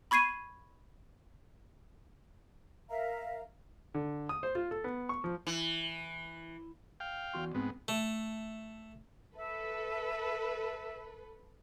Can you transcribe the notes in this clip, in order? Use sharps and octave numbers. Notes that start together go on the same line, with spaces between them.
B5 C#6 G#6 C7 D#7
A#4 E5 F5 A#5
D3
D#6
C5
F4
A4
B3
C#6
F3
E3
F5 G5
E2 F#4 C6
G#2 B3 C4
A3
A4 B4 E5